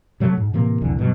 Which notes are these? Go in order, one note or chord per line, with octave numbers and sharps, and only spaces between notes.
C3 F#3 A3
G#2
A2 C3 E3 A#3
F1 C2 D3 E3
G2 B2 F3 F#3